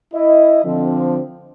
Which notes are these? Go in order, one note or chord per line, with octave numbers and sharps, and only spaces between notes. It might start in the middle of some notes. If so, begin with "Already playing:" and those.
E4 D#5
D3 F3 C4